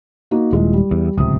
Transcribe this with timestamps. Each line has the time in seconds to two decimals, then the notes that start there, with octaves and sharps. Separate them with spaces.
0.31 A#3 D#4 F#4
0.53 D#1 G#3 E4 F4
0.74 G3
0.91 E2
1.18 D1 C#2 C3 D#6